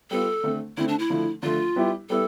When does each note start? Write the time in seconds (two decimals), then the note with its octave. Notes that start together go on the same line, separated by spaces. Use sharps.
0.11 G3 B3 F4 A4
0.43 D3 A3 C4
0.77 D3 A3 C4 E4
0.88 D4
0.99 E4
1.10 D3 F3 A3
1.43 D3 F3 A3 F4
1.76 G3 B3 E4 G4
2.09 G3 B3 E4 A4